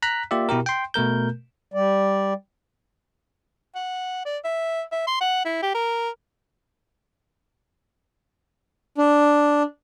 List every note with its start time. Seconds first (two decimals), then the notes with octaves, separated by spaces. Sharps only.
0.02 A#5 F#6 B6
0.31 A#3 F4 G4 D5 E5
0.49 B2 E4 G4 A#4
0.66 G5 C6
0.94 B2 A3 A#4 G6
1.74 G3 D5
3.75 F#5
4.26 D5
4.45 E5
4.92 E5
5.07 C6
5.21 F#5
5.46 E4
5.63 G4
5.75 A#4
8.98 D4